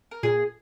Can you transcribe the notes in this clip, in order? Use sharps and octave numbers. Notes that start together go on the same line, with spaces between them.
A#4
A#2 G#4